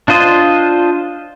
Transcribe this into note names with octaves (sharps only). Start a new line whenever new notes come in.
D4 F4 C5 D#5